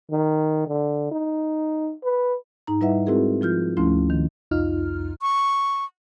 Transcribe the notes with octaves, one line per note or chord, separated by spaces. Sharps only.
D#3
D3
D#4
B4
G#2 D#4 A#5
G3 E4 B4 D#5 E5 F#5
G#3 C4 E4 F#4 G#4 A#4
F3 F4 F6 G6
D2 F3 A3 C#4 E4 C6
D#3
C2 F2 D#4 F4 F6
C#6